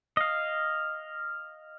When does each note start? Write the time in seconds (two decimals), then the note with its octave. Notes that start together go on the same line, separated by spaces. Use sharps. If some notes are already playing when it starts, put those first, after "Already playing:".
0.17 D#5 F5